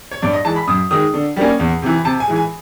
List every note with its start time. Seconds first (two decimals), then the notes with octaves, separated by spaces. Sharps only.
0.11 C#5
0.22 G2 D5
0.34 D#5
0.45 E3 G#3 A5
0.56 B5
0.67 F#2 D#6
0.91 D#3 G#3 D#6
1.14 D3
1.36 G3 A#3 C#4
1.59 E2
1.82 C3 E3
2.05 C3 A5
2.20 G#5
2.28 E3 G#3
2.36 G#5